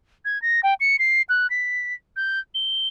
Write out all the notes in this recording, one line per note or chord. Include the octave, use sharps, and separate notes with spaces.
G#6
A#6
G5
C#7
C7
F#6
B6
G6
G7